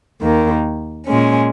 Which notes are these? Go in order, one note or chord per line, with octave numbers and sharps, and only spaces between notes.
D#2 D#3 A#3
A#2 G#3 C#4